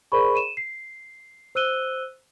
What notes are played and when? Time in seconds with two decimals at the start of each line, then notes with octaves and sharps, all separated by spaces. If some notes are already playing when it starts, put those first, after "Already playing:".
0.12 G#4 A#4 C5 D5 B5 C#6
0.35 D#7 E7
0.57 C7
1.55 C5 E6 F#6 D#7 G7